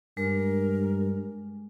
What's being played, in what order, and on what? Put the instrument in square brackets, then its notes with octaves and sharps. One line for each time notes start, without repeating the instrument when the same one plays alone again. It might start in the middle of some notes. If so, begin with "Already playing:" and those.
[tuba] G2 [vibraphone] G#3 [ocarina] A#4